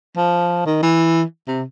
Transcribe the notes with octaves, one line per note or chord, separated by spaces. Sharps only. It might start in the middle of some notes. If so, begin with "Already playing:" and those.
F3
D#3
E3
C3